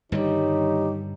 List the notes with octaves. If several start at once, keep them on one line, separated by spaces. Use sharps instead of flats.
G2 D3 D#3 G3 D#4 G4 C#5